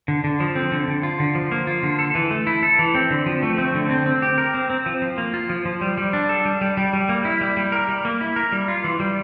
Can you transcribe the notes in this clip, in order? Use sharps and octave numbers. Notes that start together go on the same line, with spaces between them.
D3
D3
F3
C4
D3
D3
F4
D3
F3
A#3
F4
D3
A4
E3
A3
E4
A4
E3
C4
D3
F3
A3
C4
D3
C4
C4
G4
A#4
C4
C4
F3
F3
A#3
F4
F3
F3
G3
G3
D4
A4
G3
G3
G3
G3
A#3
E4
G3
G3
A#4
G3
A#3
E4
A#4
G3
F4
E3
G3